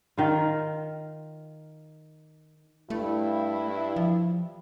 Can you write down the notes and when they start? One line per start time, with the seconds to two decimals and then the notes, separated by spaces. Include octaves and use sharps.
0.17 D#3 F4
2.90 G2 A3 E4
3.96 F3